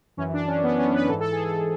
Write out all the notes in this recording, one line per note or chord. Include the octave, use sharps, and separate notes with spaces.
F#2 E3 C#4
D4
C#4
B3
C#4
B4
G#2 E3 A4
A4
G#4
A4